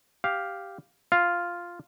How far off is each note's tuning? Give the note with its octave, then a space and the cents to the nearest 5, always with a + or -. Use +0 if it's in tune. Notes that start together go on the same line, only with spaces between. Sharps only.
G4 +0 F5 +0
F4 +0 F5 +0